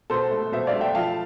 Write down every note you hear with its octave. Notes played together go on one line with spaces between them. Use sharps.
B2 A4 C5
A3
B2 C5 E5
D5 F5
A3
E5 G5
F3 F5 A5